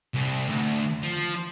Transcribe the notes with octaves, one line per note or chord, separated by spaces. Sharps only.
C2
D2
F3